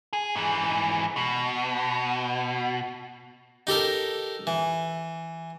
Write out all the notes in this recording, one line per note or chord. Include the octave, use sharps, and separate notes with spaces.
G#4
G#2 E3
B2
D#4 G4 A4 A#4
E3